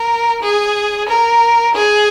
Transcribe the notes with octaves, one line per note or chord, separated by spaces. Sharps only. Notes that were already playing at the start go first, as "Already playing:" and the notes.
Already playing: A#4
G#4
A#4
G#4